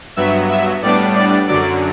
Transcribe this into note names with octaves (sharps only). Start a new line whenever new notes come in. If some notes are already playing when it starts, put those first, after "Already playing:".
G2 F#3 B3 E5
E5
A2 G3 B3 D4 D5
D5
F#2 D3 F#3 D5